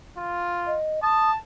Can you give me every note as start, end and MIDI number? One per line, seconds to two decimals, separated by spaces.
0.17 0.76 65
0.67 1.00 75
1.03 1.35 81
1.03 1.31 87